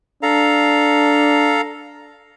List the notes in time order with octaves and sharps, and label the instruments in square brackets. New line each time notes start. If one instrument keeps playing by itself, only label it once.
[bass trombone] D4 [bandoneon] A4 F5 A#5